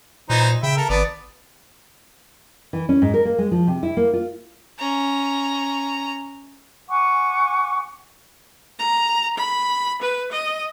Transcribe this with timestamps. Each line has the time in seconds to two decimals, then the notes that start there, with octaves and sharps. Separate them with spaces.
0.30 A#2 E3 D#4 C5
0.63 C#3 E5 G5 B5
0.77 A4 A#4
0.89 G#1 B3 D5
2.73 E3
2.89 C#4
3.02 G#2
3.14 A#4
3.25 A#3
3.38 G#3
3.51 F3
3.67 C3
3.83 E4
3.97 A#3
4.13 F4
4.79 C#4 A#5
6.88 F#5 G#5 C#6 D6
8.79 A#5
9.37 B5
10.01 B4
10.31 D#5